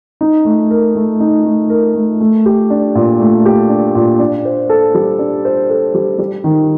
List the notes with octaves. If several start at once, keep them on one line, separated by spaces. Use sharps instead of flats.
D#4
A3
A#4
A3
D#4
A3
A#4
A3
A3
G4
D4
A#2
A3
G4
D4
A#2
D4
C5
A4
G3
D4
C5
A4
G3
G3
D#3